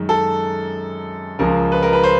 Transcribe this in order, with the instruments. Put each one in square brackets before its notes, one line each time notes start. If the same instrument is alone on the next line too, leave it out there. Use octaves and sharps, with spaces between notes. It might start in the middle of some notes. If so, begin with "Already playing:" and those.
Already playing: [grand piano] F#2 D#3 G#3
A4
C#2 C#3 F3 G#3 A#4
B4
A#4
B4
C5